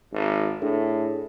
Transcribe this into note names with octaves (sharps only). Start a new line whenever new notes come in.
G#1
A2 D4 G#4 A4